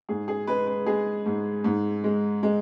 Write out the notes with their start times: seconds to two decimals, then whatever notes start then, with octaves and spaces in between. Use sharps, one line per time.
0.09 G#2 G#4
0.28 G#4
0.47 G#3 B4
0.67 B4
0.86 G#3 G#4
1.26 G#2
1.64 G#2
2.04 G#3
2.43 G#3